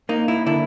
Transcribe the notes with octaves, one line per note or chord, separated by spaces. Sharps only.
A#3 D#4
E4
D3 E4